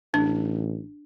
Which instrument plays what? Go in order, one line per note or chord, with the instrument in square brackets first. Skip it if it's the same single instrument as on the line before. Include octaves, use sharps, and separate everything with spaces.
[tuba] A1 [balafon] D4